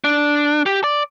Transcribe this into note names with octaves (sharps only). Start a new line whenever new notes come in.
D4
G4
D5